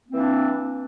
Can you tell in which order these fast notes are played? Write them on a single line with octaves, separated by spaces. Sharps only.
A#3 C4 E3 D4